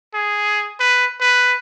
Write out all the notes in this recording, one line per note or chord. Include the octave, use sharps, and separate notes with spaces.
G#4
B4
B4